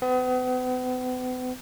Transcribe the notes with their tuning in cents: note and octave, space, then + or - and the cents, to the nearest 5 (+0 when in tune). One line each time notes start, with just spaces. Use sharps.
B3 +40